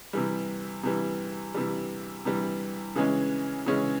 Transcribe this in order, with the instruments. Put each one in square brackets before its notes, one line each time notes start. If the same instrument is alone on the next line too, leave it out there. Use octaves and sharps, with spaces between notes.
[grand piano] C3 E3 G3
C3 E3 G3
C3 E3 G3
C3 E3 G3
C#3 E3 G#3 C#4
C#3 E3 G#3 C#4